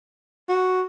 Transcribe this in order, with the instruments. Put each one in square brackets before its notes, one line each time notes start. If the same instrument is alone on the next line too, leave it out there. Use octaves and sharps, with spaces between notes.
[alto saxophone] F#4